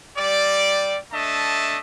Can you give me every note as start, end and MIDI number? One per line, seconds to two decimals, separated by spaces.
0.17 0.97 55
0.17 0.97 74
1.13 1.78 57
1.13 1.78 62
1.13 1.78 75
1.13 1.78 76
1.13 1.78 81